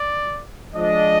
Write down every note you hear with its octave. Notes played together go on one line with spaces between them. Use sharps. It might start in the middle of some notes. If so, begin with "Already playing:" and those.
Already playing: D5
F3 G#3 D4 D#5